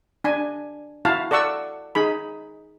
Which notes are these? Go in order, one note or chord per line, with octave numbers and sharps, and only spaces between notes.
D4 G#5
E4 F#4 F5 A5
A4 D5 F#5 C#6 E6
D#4 G#4 B5